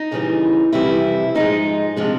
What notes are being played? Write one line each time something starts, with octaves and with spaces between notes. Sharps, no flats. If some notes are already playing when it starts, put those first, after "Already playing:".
Already playing: D#4
D#2 C#3 E3 G3
F2 C3 E3 G3 E4
G#2 F3 G#3 D#4
C3 F3 G#3 D4